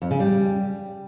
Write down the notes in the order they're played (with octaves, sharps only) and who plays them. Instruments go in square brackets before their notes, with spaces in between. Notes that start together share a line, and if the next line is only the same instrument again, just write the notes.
[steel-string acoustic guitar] F2
C#3
G3